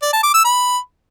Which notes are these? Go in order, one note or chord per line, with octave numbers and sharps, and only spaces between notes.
D5
A5
D6
E6
B5